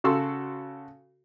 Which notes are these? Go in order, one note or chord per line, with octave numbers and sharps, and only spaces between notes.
C#3 F#4 A4 C6 E6